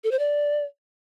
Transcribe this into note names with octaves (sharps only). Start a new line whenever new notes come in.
A4
C5
D5